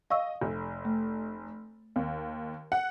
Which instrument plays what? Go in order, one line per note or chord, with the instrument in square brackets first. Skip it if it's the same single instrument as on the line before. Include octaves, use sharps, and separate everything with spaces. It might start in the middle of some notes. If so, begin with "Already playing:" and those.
[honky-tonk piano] D#5 [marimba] F5 C#6 E6
[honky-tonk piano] F1
[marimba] A3
[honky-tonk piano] D#2
F#5